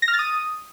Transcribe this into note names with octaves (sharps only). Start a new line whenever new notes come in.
A#6
F6
A6
D#6